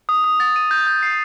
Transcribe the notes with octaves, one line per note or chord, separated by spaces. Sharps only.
D#6
D#6
A6
D#7
G6
G6
C7